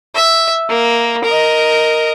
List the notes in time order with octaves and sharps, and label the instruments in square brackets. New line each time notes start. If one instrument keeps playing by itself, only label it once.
[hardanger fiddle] E5
A#3
A#4 D#5